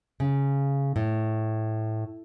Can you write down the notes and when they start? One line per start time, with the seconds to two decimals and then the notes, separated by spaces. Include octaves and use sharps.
0.20 C#3
0.96 A2